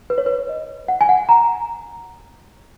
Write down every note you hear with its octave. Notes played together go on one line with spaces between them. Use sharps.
B4
C#5
B4
D#5
F#5
G#5
F#5
A#5